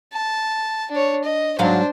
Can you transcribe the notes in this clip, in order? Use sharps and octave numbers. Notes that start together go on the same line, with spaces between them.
A5
D4 C#5
D#5
G#2 F#3 D4 C5 F5